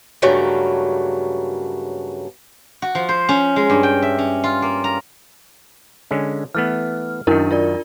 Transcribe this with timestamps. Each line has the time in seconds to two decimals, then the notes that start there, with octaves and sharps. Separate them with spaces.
0.22 G2 C#3 F#3 A3 A#3
2.82 F#4
2.95 F3
3.09 C5
3.29 C#4
3.56 G#3
3.70 G2
3.83 G5
4.02 E5
4.19 C#4
4.44 F4
4.62 A#3
4.84 A#5
6.11 D3 G#3 C#4
6.55 E3 A3 B3 F6
7.27 F#2 D#3 D4 E4 A#4
7.51 F4 A#4 D5